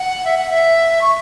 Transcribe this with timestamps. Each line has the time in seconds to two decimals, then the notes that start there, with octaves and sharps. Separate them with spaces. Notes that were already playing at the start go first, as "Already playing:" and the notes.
Already playing: F#5
0.25 E5
0.38 F#5
0.50 E5
1.01 C#6